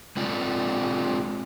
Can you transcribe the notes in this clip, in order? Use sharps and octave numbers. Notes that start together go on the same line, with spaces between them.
G#3 C4 F4 D5